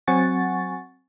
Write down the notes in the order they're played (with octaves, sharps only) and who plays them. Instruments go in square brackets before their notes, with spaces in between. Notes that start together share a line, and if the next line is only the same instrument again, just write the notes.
[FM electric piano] F#3 C4 F#5 G#5 C#6 A6